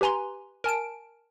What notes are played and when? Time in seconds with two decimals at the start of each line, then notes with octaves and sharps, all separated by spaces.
0.01 G4 B4 G#5 A#5 C6
0.64 A#4 G#5 A5 D7